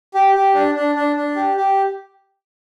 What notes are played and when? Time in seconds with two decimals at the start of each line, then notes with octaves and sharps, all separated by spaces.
0.14 G4
0.35 G4
0.54 D4
0.75 D4
0.95 D4
1.16 D4
1.36 G4
1.57 G4